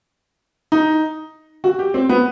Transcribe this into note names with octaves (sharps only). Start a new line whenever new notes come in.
D#4
F#4
G4
C4
B3